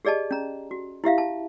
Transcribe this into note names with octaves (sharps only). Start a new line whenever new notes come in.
G4 G#4 D5 D#5 A5
C#4 A#5
F#4
E4 G4 E5 F5
A5